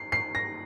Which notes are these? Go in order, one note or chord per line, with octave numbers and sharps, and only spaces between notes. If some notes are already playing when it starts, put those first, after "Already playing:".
Already playing: C7
C7
A#6